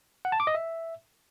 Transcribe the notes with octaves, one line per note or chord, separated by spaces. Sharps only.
F#5
A5
D6
D#5
E5